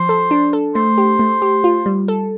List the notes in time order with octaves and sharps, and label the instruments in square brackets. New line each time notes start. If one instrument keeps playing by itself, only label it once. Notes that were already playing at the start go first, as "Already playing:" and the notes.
Already playing: [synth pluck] F3 [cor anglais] C5
[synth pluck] A4
D4
A4
[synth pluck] A3 [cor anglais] C5
[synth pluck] G4
A3
G4
F4
G3
A4